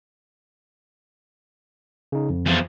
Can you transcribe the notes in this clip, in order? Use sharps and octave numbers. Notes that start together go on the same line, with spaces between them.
C#3 D#4
F2
E2 F3